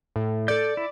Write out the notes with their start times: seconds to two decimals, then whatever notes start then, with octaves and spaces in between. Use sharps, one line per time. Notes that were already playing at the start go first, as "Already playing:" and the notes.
0.16 A2
0.48 A4 D5 G6
0.77 E4